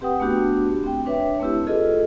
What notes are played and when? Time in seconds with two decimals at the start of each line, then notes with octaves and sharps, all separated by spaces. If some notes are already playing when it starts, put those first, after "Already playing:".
0.01 C4 G4 B4 F#5 G5 D#6
0.20 A3 B3 D4 F#4 G4
0.83 C4 G5
1.06 D4 B4 C#5 E5
1.40 A3 C4 E4 G4
1.67 F4 G#4 A4 B4 D#5